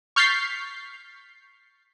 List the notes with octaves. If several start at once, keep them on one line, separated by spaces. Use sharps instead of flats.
C#6 F6 G6 A6 B6 C7